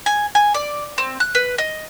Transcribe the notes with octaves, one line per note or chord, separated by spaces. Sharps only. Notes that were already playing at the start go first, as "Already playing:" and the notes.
G#5
G#5
D5
C4
F#6
B4
D#5